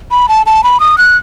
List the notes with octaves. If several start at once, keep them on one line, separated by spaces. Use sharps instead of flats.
B5
A5
A5
B5
D#6
F#6